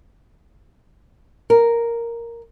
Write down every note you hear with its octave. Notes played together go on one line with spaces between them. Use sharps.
A#4